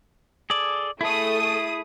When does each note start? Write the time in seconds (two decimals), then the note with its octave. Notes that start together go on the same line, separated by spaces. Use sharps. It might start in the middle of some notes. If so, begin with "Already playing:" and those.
0.50 G#4 A4 D5
1.01 A3 E4 G#4 D#6